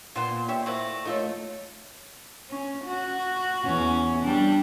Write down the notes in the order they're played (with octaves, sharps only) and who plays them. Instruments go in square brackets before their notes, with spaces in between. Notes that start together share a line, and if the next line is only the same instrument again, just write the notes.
[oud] A#2 [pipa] B3 F4 [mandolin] C5
[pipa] G4 C#5 E5
[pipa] A3 E4 C5 [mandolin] F#4
[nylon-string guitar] F3 A#4 C#5 [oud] A3 F4 A4 [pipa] D#4
[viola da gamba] C#4
F#4
E2 C#4
G3 D4